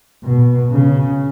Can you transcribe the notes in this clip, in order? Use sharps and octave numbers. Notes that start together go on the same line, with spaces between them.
B2
C#3